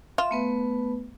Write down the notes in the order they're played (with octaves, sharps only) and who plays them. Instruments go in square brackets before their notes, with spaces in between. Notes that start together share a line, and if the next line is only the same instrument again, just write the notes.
[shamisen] F4 [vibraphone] E5
[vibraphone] A3 B3 B4